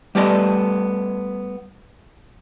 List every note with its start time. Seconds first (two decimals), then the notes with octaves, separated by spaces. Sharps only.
0.15 G3 A3 B3 A4 D5 D#5